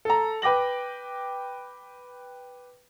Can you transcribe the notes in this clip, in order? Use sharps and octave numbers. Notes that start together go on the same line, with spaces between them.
A4 A#5
B4 G5 D6 A#6 F#7